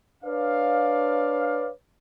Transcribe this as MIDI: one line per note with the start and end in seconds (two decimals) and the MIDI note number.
0.24 1.69 62
0.24 1.69 71
0.24 1.69 73
0.24 1.69 74
0.24 1.69 77